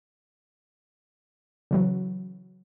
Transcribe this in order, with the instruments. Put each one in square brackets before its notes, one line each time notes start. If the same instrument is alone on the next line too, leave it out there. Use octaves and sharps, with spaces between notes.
[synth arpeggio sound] C#3 E3 F#3